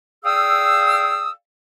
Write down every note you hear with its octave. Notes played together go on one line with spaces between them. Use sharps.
G#4 D5 F5 G5 D#6 E6